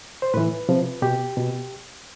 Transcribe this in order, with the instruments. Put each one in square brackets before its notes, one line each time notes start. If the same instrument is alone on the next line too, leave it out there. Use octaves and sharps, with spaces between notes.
[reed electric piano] C5
A2 E3 B4
C3 F3
B2 G4
B2